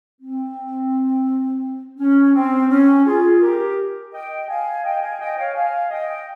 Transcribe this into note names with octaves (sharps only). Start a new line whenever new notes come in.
C4
C#4
C4
C#4
F4 G#4
G4 A#4
D#5 G5
F5 G#5
D#5 G5
F5 G#5
D#5 G5
C#5 F5
F5 G#5
D#5 G5